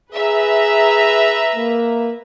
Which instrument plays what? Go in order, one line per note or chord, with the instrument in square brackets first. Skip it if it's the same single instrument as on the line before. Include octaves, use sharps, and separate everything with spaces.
[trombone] G#4 [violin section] B4 E5 A#5
[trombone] A#3